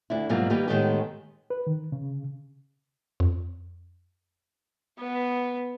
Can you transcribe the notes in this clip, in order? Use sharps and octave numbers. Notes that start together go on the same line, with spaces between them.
D2 D4 E4
G#2 B2 F#3 G3 A#3 F4
D#3 G3 A#3 G4 B4
A2 D#3 G#3 A3 B3 G4
B4
D#3
C#3
F2
B3